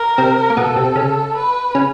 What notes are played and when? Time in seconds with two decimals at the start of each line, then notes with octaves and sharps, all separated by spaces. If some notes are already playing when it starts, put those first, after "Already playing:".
Already playing: A#4
0.18 C3 C4
0.50 A#3
0.57 B2 B3 A4
0.76 C3 C4
0.96 C#3 C#4
1.35 B4
1.75 C#3 C#4